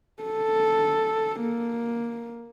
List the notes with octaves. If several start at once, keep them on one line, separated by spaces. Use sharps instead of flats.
A4
A#3